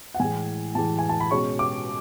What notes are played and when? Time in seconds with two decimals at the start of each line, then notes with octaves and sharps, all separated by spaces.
0.14 F#5
0.20 A2 E3 G#3 G#5
0.75 A2 E3 G#3 A5
0.99 G#5
1.09 A5
1.20 B5
1.31 B2 G#3 C#4 C#6
1.59 D6